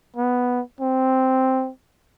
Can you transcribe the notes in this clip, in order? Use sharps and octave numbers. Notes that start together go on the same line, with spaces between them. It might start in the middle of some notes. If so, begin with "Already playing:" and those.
B3
C4